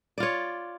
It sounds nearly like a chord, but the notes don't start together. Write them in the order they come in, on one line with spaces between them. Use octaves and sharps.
D5 F4 C#5